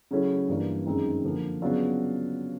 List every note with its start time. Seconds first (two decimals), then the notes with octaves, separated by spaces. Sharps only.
0.11 C#3 F#3 A3 C#4 E4
0.48 G2 E3 G3 A#3 D4
0.86 F#2 D#3 G#3 C4 D#4
1.24 D3 F3 A#3
1.62 C#3 F#3 B3 D4 F4